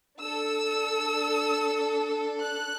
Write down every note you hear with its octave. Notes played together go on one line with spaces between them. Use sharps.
D4 A4 E6
F#6